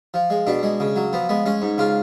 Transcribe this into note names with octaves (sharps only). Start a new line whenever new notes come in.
F3
G#3
B2 D4
G#3
C#3
F#3
F3 B3
G#3 B3
G#3 C#4
G#2
C#3 F4